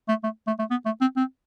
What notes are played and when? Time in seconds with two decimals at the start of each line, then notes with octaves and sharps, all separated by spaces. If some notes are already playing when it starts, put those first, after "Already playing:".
0.09 A3
0.24 A3
0.47 A3
0.59 A3
0.70 B3
0.85 A3
1.01 C4
1.16 C4